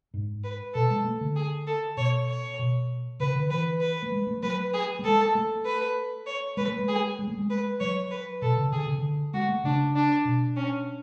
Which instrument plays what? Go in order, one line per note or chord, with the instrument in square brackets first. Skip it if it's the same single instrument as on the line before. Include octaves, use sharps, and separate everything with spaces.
[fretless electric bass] G#2
[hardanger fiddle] B4
[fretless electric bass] B2 [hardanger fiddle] A4
[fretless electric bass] G#3
A3
D3
[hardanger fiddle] G#4
A4
[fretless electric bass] B2 [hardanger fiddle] C#5
[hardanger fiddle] C#5
[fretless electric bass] B2
[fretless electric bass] C#3 [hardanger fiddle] B4
[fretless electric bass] D3
[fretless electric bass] E3 [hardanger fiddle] B4
[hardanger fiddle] B4
[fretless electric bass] A3
G#3
A3
[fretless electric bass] F#3 [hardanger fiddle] B4
[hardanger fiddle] G#4
[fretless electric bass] A3
[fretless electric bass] G#3 [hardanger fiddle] A4
[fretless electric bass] A3
[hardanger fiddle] B4
C#5
[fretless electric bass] G#3 [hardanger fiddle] B4
[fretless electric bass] A3
G#3
[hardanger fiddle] G#4
[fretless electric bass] G#3
A3
G#3
[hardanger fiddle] B4
[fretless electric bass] F#3 [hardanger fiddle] C#5
[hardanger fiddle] B4
[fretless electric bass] B2 [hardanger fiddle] A4
[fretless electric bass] C#3
[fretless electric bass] D3 [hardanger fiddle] G#4
[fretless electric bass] C#3
D3
[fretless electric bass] G#3 [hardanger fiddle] F#4
[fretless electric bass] A3
[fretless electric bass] C#3 [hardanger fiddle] D4
[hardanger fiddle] D4
[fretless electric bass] B2
[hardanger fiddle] C#4